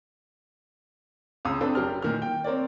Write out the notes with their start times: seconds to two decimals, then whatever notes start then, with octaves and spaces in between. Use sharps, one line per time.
1.45 C#2 D#6 E6
1.61 C4 D4 A4 B4
1.75 F#1 G4 A#4 F6
2.02 A#2 D#3 F6
2.22 G5
2.44 C4 A#4 C#5 D5